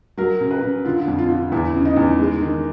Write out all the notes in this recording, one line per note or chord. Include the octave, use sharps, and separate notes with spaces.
F#3 A#4
C#3
B4
C#3
D3 F4
F2
F4
D3
E2 E4
C#3
D#4
E2
G#3
D#3